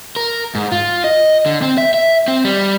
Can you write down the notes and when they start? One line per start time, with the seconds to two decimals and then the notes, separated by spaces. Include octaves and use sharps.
0.16 A#4
0.55 G#2
0.72 F4
1.04 D#5
1.46 D3
1.62 C4
1.78 E5
1.94 E5
2.28 C4
2.45 G3